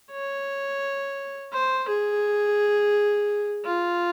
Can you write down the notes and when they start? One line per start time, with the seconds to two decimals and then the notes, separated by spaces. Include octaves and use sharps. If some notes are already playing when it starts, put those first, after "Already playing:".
0.12 C#5
1.53 C5
1.88 G#4
3.65 F4